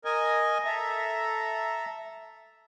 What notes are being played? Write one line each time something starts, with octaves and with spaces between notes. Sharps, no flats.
A#4 D#5 G#5
A4 E5 A#5